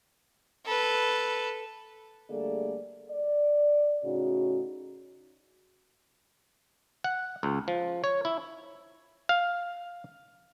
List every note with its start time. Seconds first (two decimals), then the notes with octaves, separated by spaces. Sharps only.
0.66 A4 B4
2.29 D3 G3 A3 A#3 G#4 D5
3.10 D5
4.04 A2 C#3 C#4 D#4 F#4
7.04 F#5
7.43 C#2
7.68 F3
8.04 C#5
8.25 E4
9.29 F5